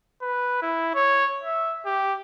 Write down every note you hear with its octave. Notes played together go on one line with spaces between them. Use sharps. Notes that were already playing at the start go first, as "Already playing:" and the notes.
B4
E4
C#5
E5
G4